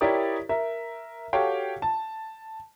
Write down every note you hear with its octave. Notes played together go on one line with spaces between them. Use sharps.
E4 G4 A#4 C#5 D5 D#6
A#4 E5
F#4 G4 A4 C#5 F5 G5
A5